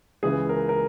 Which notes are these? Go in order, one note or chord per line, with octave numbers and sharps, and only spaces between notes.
C#2 C#3 E3 G#4
A#4
A#4